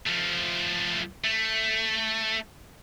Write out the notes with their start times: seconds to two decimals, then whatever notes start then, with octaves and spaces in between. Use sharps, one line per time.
0.06 F3 A3
1.24 A3